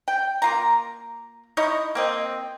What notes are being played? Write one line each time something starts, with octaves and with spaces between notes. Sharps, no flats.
G5
A#3 F4 A#5
D#4 E4 C#5 D#5
A#3 C4 D#5